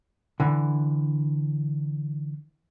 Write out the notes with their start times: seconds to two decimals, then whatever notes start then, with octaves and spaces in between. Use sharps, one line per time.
0.40 D3 E3